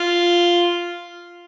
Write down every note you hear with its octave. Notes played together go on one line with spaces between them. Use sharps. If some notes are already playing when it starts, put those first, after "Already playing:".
Already playing: F4